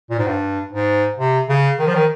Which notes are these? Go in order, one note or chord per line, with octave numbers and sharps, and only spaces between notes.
A#2
G#2
G2
G#2
C3
C#3
D#3
F3
D#3